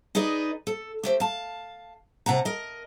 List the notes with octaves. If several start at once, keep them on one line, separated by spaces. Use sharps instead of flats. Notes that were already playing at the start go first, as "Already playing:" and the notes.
D#4 G#4 B4 D5 D#5
A4
A3 G4 C5
F5 A5
C3 F#5 A5 A#5
A#4 D#5